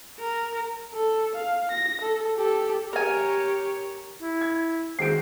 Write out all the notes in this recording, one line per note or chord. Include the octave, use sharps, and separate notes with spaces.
A#4
A4
F5
A#6
A4
G4 A4
G4 A#4 C#5 G#5
E4
G#6
D#3 G#3 F#4 C5 C7 D7